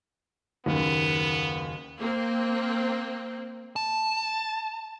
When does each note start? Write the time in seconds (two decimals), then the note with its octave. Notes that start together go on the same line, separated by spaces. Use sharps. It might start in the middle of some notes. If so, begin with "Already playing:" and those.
0.66 F#1 D#2 B3
2.00 A#3 C4
3.76 A5